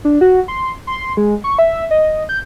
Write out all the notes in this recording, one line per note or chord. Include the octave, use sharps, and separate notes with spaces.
D4
F#4
C6
C6
G#3
C#6
E5
D#5
G6